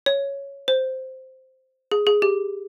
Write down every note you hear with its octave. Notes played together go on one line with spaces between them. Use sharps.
C#5
C5
G#4
G#4
G4